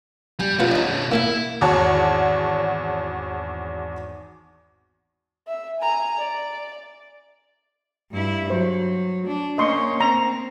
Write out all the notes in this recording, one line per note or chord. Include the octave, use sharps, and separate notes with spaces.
G3 G#5
B2 C#4 F4 B4 F#5
D4 D#4
A#3 E4 A4 F5
G#1 E2 F#4 C#5 A5
E5
G#5 A#5
D5
G2 E4
F#3 C5
D4
A#3 C#4 D#5 C6 C#6
C4 A#5